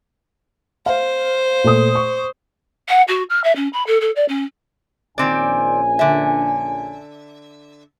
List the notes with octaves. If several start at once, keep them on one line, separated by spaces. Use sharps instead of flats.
C5 F5
A#2 A3 D#6
C#6
F#5
F#4
F6
E5
C#4
B5
A4
A4
D5
C#4
A#1 D#3 C4 C#4 D5 G#5
D3 E5